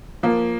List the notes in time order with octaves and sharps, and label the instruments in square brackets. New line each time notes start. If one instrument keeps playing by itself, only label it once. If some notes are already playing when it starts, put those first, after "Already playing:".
[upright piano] F3 A#3